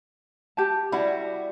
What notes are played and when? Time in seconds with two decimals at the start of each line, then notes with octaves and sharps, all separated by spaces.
0.57 G4 A5
0.92 G3 E4 F#4 B5